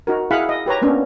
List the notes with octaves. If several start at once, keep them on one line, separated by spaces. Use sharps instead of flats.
D#4 F#4 A#4
E4 G#4 F5 F#5 B5
D#5
G4 B4 C#5 A#5
A#3 B3 C#4 D4